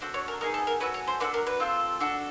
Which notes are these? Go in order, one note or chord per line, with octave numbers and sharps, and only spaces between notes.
D4 F#4 A4 C5
C#5
A#4
B3 D#4 G#4 A#4
A4
A#4
C#4 F#4 A4 B4
C#5
C5
D4 F#4 A4 B4
A#4
B4
C4 F4 A4
D4 F#4 A4